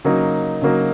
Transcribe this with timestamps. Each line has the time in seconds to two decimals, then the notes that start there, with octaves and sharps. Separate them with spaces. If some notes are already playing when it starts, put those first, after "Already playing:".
0.05 C#3 F#3 A#3 D#4
0.62 C#3 F#3 A#3 D#4